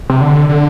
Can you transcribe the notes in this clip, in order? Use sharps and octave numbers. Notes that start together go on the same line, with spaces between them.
C3
D3
D3